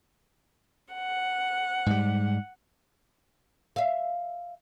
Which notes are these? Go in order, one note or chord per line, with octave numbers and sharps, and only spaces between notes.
F#5
G#2 G3
E5 F5